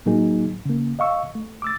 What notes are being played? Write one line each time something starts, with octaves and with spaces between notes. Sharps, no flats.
A2 F#3 A#3 D#4 G#4
C#3 A#3
D#5 F5 C#6 E6
A3
D6 E6 A6